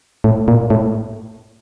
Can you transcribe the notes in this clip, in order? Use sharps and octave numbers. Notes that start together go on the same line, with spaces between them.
A2
A#2
A2